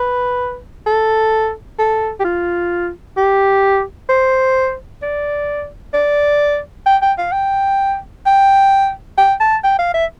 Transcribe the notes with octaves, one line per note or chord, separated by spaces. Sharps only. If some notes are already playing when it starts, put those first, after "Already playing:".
Already playing: B4
A4
A4
G4
F4
G4
C5
D5
D5
G5
G5
F5
G5
G5
G5
A5
G5
F5
E5